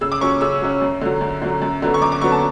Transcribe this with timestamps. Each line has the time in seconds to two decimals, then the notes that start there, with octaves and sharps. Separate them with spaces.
0.01 C#3 E6
0.12 D6
0.21 F#3 C#4 C#6
0.41 C#3 E6
0.62 F#3 C#4
0.82 F#2
1.01 D3 F#3
1.21 F#2
1.42 D3 F#3
1.62 F#2
1.82 D3 F#3 B3
1.94 C#6
2.02 F#2 D6
2.12 D6
2.21 D3 F#3 B3 C#6
2.32 A5